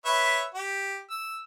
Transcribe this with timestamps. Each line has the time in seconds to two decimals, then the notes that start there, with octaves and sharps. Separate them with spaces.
0.05 B4 C#5 E5
0.54 G4
1.10 E6